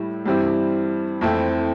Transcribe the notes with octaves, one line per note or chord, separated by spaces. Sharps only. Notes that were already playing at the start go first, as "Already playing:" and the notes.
Already playing: A2 G3 E4
G2 E3 G3 C4 E4
F2 E3 A3 C4 E4